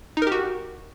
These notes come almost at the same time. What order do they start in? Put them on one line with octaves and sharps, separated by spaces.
D#4 A#4 G4 F#4